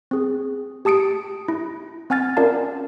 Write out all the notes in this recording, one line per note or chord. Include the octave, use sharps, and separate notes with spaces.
C4 G#4
G4 A5 D#6 C#7 D7
E4
C4 F#5 G#5 F6 A6
C#4 F4 A#4 D5 F5 A5